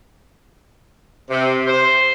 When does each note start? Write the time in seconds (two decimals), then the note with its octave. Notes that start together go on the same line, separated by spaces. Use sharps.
1.30 C3
1.67 C5